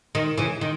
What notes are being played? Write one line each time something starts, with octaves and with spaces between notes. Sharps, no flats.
D#3
C#3 E3
D#3